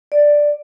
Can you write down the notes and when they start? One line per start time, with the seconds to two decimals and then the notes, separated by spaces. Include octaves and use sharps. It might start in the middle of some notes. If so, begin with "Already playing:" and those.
0.12 D5